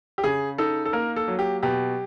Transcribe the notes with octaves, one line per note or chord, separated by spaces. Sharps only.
G4
C#3 G#4
D#4 A4
A4
A#3 A#4
A4
F#3
G4
B2 G4